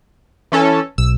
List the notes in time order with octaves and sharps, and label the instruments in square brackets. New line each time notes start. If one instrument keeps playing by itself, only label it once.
[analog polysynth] E3 C#4 A4
[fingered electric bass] B1 [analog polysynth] E6